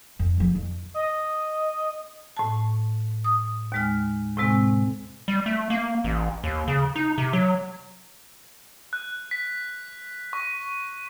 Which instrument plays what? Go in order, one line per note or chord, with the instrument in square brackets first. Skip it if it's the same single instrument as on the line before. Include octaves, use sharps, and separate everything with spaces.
[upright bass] F2
C3 F3
F2
[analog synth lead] D#5
[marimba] A2 A5
D#6
D#2 G#3 F6
A2 C3 G#3 C4
[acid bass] G3
A3
A#3
A1
D#2
C#3
D#4
C3
F#3
[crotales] F#6
B6
C#6